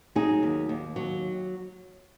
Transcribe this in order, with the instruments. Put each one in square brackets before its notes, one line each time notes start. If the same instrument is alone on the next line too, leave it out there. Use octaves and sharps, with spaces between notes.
[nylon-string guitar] F#3 D#4 G#4
D#2
D#2
F#3